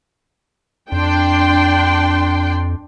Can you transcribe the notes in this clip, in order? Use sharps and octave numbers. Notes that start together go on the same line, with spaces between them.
F2 D4 G5 C6